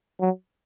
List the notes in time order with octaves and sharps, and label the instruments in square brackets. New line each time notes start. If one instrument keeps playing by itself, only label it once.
[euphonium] F#3